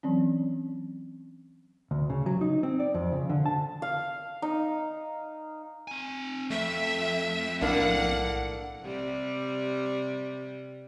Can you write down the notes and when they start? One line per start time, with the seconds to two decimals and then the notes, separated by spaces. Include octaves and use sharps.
0.03 E3 F#3 C4 C#4
1.91 D2
2.10 C#3
2.26 F#3
2.41 D#4
2.63 C4
2.80 D5
2.94 F2
3.12 C#3
3.29 D3
3.46 A5
3.82 F5
4.42 D#4
5.88 C4 G#5
6.50 F2 A3 E5
7.61 B1 A2 A#3 D4 F#5
8.83 C3 G3